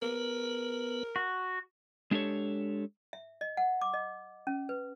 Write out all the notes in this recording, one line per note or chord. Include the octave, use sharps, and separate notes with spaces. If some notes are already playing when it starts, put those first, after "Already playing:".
B3 A#4 B4
F#4
G#3 D4 G4 A4 C#5
E5
D#5
F#5
D6
D#5
C#4
B4